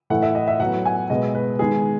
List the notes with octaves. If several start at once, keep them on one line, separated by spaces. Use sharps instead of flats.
A2 E3 A3 F#5
E5
D#5
E5
A2 F#3 B3 F#5
G#5
B2 G#3 B3 D#5
B4
D#3 G#3 B3 G#4